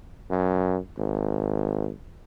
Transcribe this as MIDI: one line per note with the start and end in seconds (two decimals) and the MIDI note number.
0.30 0.78 42
0.98 1.90 32